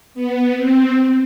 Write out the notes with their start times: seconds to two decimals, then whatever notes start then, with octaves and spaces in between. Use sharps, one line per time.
0.14 B3
0.55 C4